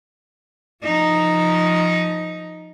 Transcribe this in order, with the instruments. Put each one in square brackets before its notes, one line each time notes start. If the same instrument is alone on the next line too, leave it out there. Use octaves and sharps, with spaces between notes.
[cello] F3 D#4